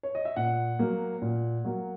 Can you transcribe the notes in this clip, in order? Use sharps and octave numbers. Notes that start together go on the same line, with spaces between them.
C#5
D#5
E5
A#2 F#5
F#3 A#3
A#2
F#3 A#3